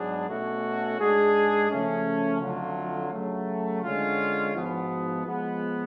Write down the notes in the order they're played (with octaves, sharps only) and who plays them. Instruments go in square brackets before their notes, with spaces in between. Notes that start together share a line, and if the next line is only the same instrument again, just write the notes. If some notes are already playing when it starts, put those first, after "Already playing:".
Already playing: [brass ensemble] G#2 F#3 B3 D4 G#4
B2 A3 C#4 F#4 A4
G#2 G#3 D4 G#4
C#3 F3 A3 C#4
F2 D3 F#3 A3 F4
C#3 F#3 A3
D3 G#3 C#4 F4
G#2 F3 B3 F#4
F3 G#3 B3